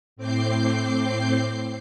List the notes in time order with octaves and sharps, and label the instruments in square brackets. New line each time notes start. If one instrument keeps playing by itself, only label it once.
[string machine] A2 C4 D6 G6 C7